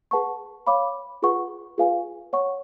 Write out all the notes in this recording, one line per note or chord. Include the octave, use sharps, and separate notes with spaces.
G#4 B4 F#5 A5 C#6
C#5 F5 B5 D6
F4 G#4 B4 F#5 C#6
F4 G#4 B4 F5 G#5
C#5 F#5 C#6